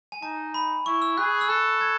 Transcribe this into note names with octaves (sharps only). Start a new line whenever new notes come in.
G#5
D#4 A5
B5
E4 C#6
E6
G#4 F#6
E6
A4 F#6
G#6